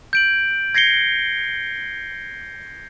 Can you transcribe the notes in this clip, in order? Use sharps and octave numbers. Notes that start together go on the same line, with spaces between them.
G6 D7 F#7
G#6 A#6 C7 C#7 G7